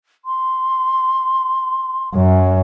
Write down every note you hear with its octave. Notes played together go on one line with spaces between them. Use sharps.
C6
F#2